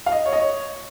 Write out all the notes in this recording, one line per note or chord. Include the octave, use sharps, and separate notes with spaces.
F5
D#5
C#5
D#5
C#5